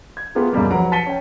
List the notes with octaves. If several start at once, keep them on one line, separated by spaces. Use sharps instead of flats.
G#6
A3 B3 F4 G4 G#4 A#4
C#2 F#2 B2 G3 A#3
F1 F#3 B4 F#5 A#5 D7
A5 A6 B6 C#7 D#7 G7
C#4 G5